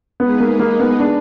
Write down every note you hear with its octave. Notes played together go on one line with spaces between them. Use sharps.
G#3 B3 D#4 G#4 B4
A#3
A#3
B3
D4